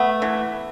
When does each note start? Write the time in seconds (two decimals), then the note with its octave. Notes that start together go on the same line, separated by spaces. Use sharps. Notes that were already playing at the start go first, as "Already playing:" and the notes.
Already playing: A3 B3
0.22 E3